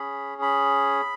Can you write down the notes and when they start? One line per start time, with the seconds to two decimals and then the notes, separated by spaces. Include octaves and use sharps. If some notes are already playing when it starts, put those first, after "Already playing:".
Already playing: C#4 G#4 B5
0.42 B5